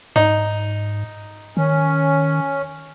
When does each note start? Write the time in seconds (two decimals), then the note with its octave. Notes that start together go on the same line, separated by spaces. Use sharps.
0.16 G#2 D#4
1.57 D#3 C#4